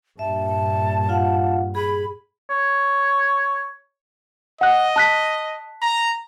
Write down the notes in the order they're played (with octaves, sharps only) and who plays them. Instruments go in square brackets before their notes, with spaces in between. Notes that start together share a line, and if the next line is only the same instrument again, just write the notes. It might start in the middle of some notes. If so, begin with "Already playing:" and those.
[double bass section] G2 A#2 [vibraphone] E5 [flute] A5
[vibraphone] F4 F5 F#5
[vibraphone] G#4 [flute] B5
[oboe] C#5
[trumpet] D#5 [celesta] F#5 F#6
[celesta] A5 F#6 B6
[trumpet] A#5